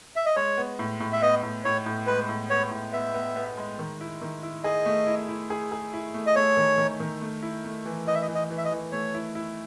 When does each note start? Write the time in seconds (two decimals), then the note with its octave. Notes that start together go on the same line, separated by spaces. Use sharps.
0.16 E5
0.26 D#5
0.36 G#3 C#5
0.58 B3
0.79 A2
1.00 A2
1.13 E5
1.22 B3 D#5
1.43 A2
1.65 A2 C#5
1.86 A2
2.07 G#3 B4
2.29 A2
2.50 B3 C#5
2.71 A2
2.93 B3 E5
3.14 B3
3.36 B3
3.57 G#3
3.79 D#3
4.01 E4
4.22 D#3
4.43 E4
4.64 G#4 D#5
4.86 A3
5.07 E4
5.28 E4
5.50 G#4
5.72 G#4
5.93 E4
6.14 A3
6.27 D#5
6.36 A3 C#5
6.57 D#3
6.78 D#3
7.00 D#3
7.21 A3
7.43 E4
7.64 A3
7.86 E3
8.07 E3 D#5
8.15 E5
8.22 D#5
8.28 E3
8.35 D#5
8.50 E3
8.57 E5
8.65 D#5
8.71 E3
8.92 A3 C#5
9.14 E4
9.35 E4